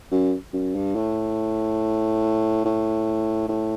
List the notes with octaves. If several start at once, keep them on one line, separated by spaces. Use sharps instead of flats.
F#2
F#2
G2
A2
A2
A2